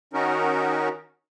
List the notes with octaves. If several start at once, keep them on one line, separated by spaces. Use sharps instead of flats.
D#3 C#4 D#4 F#4 A#4